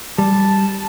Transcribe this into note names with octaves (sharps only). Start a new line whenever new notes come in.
G3 A5